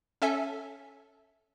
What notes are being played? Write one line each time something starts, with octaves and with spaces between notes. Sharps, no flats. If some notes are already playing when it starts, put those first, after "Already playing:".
C#4 A4 E5 G#5